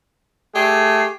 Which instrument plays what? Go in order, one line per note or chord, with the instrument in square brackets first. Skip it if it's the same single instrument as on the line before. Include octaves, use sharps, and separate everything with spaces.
[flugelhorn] A3 [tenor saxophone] G4 [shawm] G#4